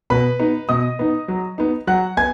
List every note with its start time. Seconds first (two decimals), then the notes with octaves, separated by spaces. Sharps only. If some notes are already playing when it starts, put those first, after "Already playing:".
0.10 B2 B4 B5
0.39 B3 D#4
0.69 B2 D#5 D#6
0.99 B3 D#4
1.28 F#3
1.58 B3 D#4
1.87 F#3 F#5 F#6
2.17 B3 G#5 G#6